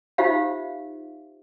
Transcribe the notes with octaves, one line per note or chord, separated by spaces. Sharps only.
D#4 F4 G4 C5 E5 F5